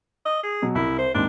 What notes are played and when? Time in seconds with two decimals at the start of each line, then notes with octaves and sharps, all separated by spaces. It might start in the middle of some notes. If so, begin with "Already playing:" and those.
0.26 D#5
0.43 G#4
0.62 B2 F#3
0.75 C2 E4
0.98 C5
1.14 D#2 G#2 C4 D4